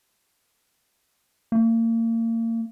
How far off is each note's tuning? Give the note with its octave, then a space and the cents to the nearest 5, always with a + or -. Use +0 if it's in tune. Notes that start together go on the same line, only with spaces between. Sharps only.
A#3 -35